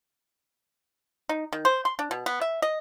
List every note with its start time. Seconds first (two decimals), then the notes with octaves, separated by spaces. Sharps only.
1.29 D#4
1.53 D#3
1.65 C5
1.85 C6
1.99 D4
2.11 B2
2.26 B3
2.41 E5
2.62 D#5